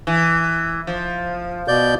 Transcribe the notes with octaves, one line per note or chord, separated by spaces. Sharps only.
E3
F3
B2 D5 G6